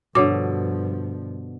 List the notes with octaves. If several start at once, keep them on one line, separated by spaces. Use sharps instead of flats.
G2 B2 D3 F3 C#5 D6